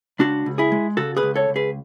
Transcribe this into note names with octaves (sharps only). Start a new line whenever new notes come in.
C#2 D4 F#4
C#2
E4 G#4
G#3
C#3 F#4 A4
G#4 B4
C#2
A4 C#5
C#2
G#4 B4